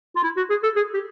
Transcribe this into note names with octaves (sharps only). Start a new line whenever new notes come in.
F4
E4
F#4
G#4
A4
G#4
G4